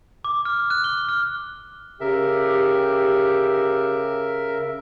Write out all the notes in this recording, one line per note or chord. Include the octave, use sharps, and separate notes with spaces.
D6
F6
F#6
G7
F6
C#3 G4 A#4 E5